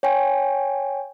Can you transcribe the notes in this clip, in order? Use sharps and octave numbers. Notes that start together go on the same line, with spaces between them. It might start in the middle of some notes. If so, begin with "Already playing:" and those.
C#5 G5 G#5